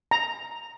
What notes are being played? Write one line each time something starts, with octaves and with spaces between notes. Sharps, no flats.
A#5